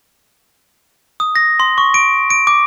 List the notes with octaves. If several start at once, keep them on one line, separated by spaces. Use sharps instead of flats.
D#6
A#6
C6
C#6
D7
D7
D6